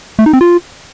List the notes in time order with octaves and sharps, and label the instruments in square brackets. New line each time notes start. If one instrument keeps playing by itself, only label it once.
[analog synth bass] A3
D#4
C4
F4